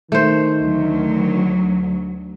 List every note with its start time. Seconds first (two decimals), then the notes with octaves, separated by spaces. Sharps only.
0.12 D#3 A3 C5
0.59 D2 F#3